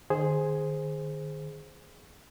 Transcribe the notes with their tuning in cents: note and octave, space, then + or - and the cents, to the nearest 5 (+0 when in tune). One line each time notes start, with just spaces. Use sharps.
D#3 -40 G#4 +0 C5 +0